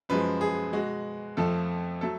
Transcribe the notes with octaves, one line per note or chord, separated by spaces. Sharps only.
F#2 F3 G#3 B4
G#4
B2 G#3 F#4
F2 F3 A3 A4
F#3 A3 A4